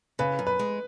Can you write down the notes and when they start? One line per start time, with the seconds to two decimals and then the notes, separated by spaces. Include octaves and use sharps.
0.19 C#3 B4
0.39 F#2
0.47 B4
0.59 G#3